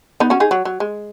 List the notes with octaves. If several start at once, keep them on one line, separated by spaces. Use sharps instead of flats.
B3 D#4
C#4 F#4
D#4 G#4
F#3
F#3
G#3